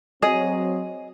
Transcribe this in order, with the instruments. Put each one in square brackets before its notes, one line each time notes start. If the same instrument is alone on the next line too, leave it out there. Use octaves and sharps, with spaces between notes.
[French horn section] F#3 C4 [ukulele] G#4 D#5